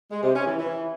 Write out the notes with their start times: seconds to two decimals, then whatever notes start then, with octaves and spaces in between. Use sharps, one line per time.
0.10 G#3
0.22 C3
0.34 C#4
0.46 E3
0.58 E3